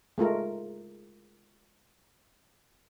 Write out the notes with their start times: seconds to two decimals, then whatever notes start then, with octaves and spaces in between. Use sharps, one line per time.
0.18 G#3 A3 F4 A#4